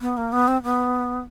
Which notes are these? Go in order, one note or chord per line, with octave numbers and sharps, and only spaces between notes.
B3
A#3
B3
C4
B3